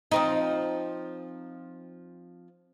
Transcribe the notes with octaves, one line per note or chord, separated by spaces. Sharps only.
F3 C4 D#4